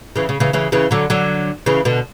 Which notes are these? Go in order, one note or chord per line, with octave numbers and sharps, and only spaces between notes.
C#3 E3
C#3
C#3 E3
C#3 E3
C#3 E3
D3 F#3
D3 F#3
C#3 E3
B2 D3